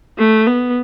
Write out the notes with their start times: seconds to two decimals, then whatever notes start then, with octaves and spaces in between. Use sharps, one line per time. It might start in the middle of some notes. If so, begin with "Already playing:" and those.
0.18 A3
0.47 B3